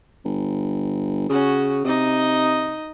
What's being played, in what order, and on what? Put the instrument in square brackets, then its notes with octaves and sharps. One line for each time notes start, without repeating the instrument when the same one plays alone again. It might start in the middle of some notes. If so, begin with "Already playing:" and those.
[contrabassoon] G1
[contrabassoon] C#3 [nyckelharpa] C#4 F#4
[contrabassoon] C3 [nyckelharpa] D#4 D#5